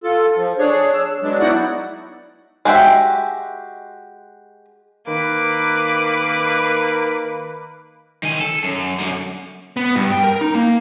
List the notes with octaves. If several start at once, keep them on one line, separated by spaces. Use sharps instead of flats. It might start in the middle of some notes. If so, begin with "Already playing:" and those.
F4 A4
F3
D4 G#4 C#5
E6
F#3 G#3 B3 D4
B3 D#4 E4 F#4 D5 F#5
G#3 F#4 G4 E5
D#3 A#3 B4 D6
D#3 G#5
A4
F#2
F#2 D3
B3
G2
G5
A#4
D#4
A#3